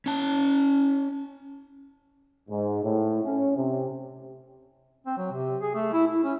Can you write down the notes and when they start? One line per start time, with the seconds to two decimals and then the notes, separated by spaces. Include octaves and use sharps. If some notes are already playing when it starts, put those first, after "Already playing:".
0.06 C#4 A5
2.49 G#2
2.84 A2
3.23 C#4
3.56 C3
5.06 C4
5.17 F#3
5.32 C3
5.61 G#4
5.75 A3
5.93 E4
6.07 E4
6.23 C#4